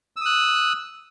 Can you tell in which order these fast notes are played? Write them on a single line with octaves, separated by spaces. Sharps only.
E6 D#6 F#6